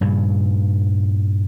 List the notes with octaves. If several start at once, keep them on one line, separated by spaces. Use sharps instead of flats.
G2 A#2 C#3